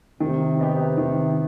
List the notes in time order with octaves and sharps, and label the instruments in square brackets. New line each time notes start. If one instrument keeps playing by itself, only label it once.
[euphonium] C3 [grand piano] D#3
[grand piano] B3 D#4 G4
D#3